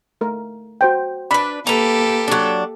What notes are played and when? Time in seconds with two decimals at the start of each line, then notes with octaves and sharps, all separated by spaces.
0.21 A3 A#4
0.81 F#4 C5 G5
1.31 D4 B4 B5
1.67 A#3 G4 A4 B4 A#5
2.28 F#3 D4